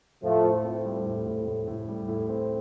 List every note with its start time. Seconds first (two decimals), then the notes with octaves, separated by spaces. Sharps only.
0.23 A2 F3 A3
0.44 A2
0.64 C4
0.85 G3
1.06 A2
1.26 A2
1.47 A2
1.67 A2
1.88 G3
2.08 A2
2.29 C4